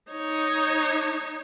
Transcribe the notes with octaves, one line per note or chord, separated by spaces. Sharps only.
D#4 C#5